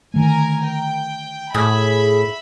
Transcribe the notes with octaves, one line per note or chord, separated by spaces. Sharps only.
D3 D#3 A3 A#4 G#5
G5
A2 G#4 E5 B5